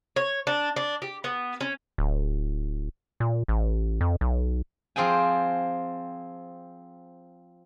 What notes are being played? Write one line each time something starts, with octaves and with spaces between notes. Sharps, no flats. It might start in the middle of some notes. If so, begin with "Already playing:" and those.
C#5
D4
D4
G4
B3
C#4
D1
A#2
A1
F2
B1
F3 C4 G#4 G5 G#5